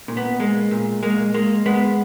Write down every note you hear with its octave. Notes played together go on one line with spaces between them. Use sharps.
A#2
B3
G#3 A#3
A#2
G#3 A#3
G#3 A#3
G#3 B3